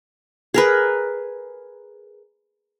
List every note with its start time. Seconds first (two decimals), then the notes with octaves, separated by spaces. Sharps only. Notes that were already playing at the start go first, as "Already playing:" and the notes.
0.54 G#4 A#4 B4